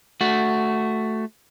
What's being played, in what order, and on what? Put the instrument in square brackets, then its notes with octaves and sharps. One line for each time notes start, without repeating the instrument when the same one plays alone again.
[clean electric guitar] A3 F#4